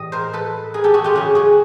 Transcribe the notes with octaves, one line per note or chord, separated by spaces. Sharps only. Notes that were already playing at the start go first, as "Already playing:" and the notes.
Already playing: A2 E3 G3 D#5
A#4 C5
A4 B4
G#4 A#4
G4 A4
F#4 G#4
F4 G4
C#3 F#3 F#4 G#4
F#4 G#4